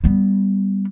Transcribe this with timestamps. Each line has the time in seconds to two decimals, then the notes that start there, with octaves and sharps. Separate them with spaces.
0.04 G3 B3